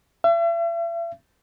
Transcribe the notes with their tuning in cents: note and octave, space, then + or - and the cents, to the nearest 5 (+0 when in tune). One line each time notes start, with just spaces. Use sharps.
E5 +40